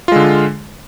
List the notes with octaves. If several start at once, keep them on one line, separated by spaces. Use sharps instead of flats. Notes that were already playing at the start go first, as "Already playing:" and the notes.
D3 G#3 F4